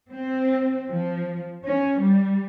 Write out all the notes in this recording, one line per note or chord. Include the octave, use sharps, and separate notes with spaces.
C4
F3
C#4
G3